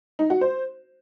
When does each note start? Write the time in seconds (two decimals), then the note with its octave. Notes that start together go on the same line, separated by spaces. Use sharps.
0.19 D#4
0.30 F#4
0.41 C5